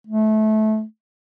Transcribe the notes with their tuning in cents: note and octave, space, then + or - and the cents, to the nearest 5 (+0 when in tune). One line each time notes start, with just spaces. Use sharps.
A3 -25